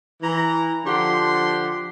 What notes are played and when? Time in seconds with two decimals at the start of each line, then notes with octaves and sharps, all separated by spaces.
0.23 E3 A#5
0.85 D3 F3 G4 F#5 C6